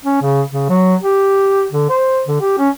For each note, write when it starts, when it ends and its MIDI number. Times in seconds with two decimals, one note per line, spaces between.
0.05 0.18 61
0.22 0.42 49
0.52 0.68 49
0.69 0.95 54
1.02 1.66 67
1.72 1.88 50
1.89 2.22 72
2.28 2.39 50
2.41 2.55 67
2.59 2.69 61